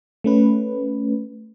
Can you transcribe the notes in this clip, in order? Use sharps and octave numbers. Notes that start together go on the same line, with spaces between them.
A3 C#4 B4